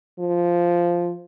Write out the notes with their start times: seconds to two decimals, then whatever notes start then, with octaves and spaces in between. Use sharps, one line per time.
0.20 F3